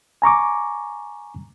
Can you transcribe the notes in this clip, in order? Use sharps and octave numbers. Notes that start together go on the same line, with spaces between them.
G#5 A#5 C#6 D6